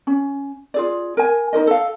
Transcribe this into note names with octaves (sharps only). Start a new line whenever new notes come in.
C#4
F4 G#4 D5
A#4 G#5
D#4 F4 A#4 D#5
A4 F5